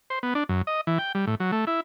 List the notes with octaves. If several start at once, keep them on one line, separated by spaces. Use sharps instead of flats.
C5
B3
D4
F#2
D#5
E3
G5
G3
A2
F#3
A3
E4